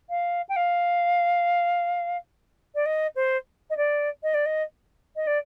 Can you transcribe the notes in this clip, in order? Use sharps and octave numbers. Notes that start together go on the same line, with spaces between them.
F5
G5
F5
D5
D#5
C5
D#5
D5
D#5
D5
D#5
D#5
D5